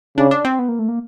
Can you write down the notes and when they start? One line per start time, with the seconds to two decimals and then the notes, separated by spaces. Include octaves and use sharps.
0.18 C#3 D4
0.31 D4
0.45 C4
0.59 B3
0.69 A#3
0.79 A3
0.89 A#3